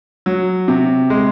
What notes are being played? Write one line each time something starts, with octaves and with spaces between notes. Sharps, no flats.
F#3
C3
G#3